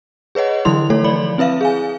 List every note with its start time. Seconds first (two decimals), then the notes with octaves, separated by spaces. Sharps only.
0.35 G#4 B4 C#5 D#5 F#5
0.65 D3 E3 F#3 E4 C6 F7
0.90 F3 A3 A4 C#5
1.04 F#3 D5 B5 F#7
1.38 C4 E4 B4 E5 F5
1.61 G#4 F5 G#5